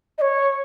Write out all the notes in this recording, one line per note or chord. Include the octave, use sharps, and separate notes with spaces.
D#5
C#5